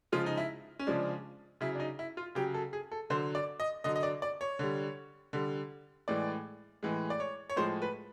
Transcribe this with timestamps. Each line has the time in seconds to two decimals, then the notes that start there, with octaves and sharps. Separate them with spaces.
0.12 C#3 F3 G#3 F4
0.26 D#4
0.38 E4
0.79 C#4
0.87 C#3 F3 G#3 D4
1.61 C#3 F#3 E4
1.75 D4
1.80 D#4
1.99 E4
2.17 F4
2.35 C#3 F#3 G4
2.54 A4
2.73 G#4
2.92 A4
3.10 D3 F#3 C5
3.35 D5
3.60 D#5
3.84 D3 F#3 D#5
3.96 D#5
4.03 D5
4.22 D5
4.41 C#5
4.59 D3 G3
5.33 D3 G3
6.08 A2 E3 G#3 D5
6.83 A2 E3 G#3
7.10 D5
7.20 C#5
7.50 C#5
7.56 A2 F3 G#3 C5
7.82 B4